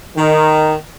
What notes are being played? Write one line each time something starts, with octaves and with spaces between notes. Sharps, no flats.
D#3